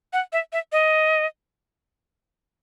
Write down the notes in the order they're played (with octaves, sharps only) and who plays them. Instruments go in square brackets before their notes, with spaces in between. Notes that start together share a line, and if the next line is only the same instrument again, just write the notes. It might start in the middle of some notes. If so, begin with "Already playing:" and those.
[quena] F#5
E5
E5
D#5